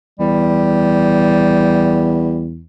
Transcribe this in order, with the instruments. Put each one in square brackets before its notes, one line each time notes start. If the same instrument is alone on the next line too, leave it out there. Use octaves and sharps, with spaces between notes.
[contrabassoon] E2 [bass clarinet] G3